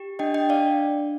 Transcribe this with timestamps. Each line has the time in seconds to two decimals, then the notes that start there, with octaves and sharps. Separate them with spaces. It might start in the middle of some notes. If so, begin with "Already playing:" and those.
Already playing: G4
0.19 D4 D#5 G5
0.34 D#5 G5
0.49 D4 D5 F5